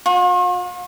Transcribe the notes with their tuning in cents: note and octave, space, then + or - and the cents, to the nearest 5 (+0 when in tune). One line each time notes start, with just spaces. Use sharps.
F4 +45